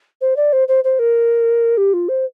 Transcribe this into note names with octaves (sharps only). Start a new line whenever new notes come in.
C5
D5
C5
C5
C5
A#4
G4
F4
C5